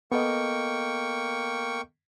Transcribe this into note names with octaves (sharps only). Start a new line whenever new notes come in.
A#3 B3 A4 D#5 G5 C#6